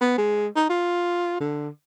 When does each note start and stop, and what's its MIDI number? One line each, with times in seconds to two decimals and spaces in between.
0.01 0.15 59
0.18 0.47 56
0.56 0.66 63
0.70 1.39 65
1.40 1.68 50